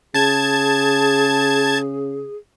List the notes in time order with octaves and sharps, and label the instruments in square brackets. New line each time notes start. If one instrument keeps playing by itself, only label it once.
[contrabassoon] C#3 [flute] G#4 [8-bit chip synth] A5 G#6